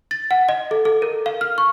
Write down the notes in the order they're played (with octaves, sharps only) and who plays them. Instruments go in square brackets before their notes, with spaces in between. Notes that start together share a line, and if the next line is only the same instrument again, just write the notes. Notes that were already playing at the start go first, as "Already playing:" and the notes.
[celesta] A6
F#5
D#5
A4
A4
A#4
F5
F6
C#6